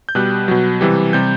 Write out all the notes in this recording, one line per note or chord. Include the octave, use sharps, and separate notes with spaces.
G6
B2 G3 F#6
B2 F#3
C3 E3 G3
C3 G3 G6